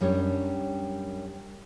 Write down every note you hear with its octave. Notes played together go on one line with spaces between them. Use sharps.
F#2 G3 D4 G4 C#5